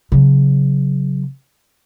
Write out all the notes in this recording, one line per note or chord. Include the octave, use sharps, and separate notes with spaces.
C#3 F#3